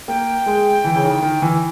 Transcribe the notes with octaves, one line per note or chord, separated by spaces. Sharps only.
A#3 G5
G#3
E3
C#3
D#3
D#3
E3